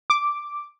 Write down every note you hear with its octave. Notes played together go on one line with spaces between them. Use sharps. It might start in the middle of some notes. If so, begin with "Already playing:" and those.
D6